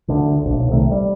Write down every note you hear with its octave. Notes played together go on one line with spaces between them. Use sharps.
D2 D3
D1 A#1
B1
C2 C3 D#3 A3
G3